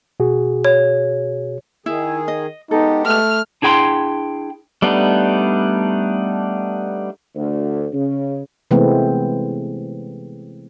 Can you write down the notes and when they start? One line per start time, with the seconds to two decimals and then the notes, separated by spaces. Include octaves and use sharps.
0.20 B2 F#4 G#4
0.65 C#5
1.86 D#3 E4 G#4
2.28 D#5
2.71 G#3 B3 D#4 G4 A4
3.06 A3 F6
3.62 D4 E4 G#4 G5 B5 C6
4.82 G3 A3 B3 D4 D#4
7.35 D2
7.93 C#3
8.71 C3 E3 G#3 A3 B3 C4